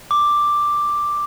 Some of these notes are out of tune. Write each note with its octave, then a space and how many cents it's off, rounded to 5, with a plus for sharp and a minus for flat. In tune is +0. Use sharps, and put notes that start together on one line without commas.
D6 +5